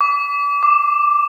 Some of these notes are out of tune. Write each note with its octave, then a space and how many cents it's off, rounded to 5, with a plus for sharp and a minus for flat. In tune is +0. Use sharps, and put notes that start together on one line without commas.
D6 -35
D6 +5